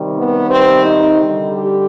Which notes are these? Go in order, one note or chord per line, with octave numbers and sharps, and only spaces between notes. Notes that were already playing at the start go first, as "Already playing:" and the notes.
Already playing: C3 D#3 G3
B3
C4
D#4
D3 G3
G4